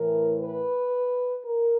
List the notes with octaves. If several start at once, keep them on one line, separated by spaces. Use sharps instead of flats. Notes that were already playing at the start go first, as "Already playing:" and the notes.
Already playing: A2 E3 A#4
B4
A#4